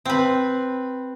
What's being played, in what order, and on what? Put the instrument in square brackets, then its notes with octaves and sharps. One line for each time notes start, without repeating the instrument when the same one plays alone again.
[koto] C4 B4